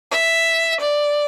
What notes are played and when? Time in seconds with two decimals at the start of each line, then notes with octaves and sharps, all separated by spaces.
0.11 E5
0.80 D5